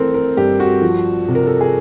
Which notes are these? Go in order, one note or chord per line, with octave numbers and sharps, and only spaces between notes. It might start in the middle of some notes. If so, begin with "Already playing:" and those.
Already playing: E3 A3 C4 A4 A#4
A#4
G2 G4
F#4
F3
C3
A#4
A4
G#4